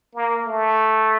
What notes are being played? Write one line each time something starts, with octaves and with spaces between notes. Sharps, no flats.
A#3
A3